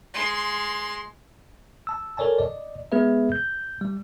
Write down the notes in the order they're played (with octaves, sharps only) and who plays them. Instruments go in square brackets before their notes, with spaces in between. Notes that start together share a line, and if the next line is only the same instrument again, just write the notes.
[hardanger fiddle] G#3 C6
[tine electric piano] A5 E6
A4 A#4 C#5 D5 G#5 A5
D5 D#5
G#3 B3 G#4 B4 E5
G6
G3